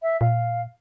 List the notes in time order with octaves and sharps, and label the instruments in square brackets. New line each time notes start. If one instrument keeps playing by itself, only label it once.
[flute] E5
[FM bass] A#2 [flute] F5